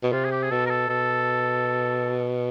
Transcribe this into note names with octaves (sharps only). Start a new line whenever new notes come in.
B2
C3 F4
G#4
G4
G#4
B2 A4
A#4
A4
B2 A4